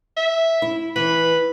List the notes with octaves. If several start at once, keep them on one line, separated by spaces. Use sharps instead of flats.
E5
E4
E3 B4